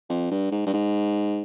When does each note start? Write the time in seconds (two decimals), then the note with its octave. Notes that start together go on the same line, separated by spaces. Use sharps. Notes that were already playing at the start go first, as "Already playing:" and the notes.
0.09 F2
0.31 G2
0.52 G#2
0.66 G2
0.74 G#2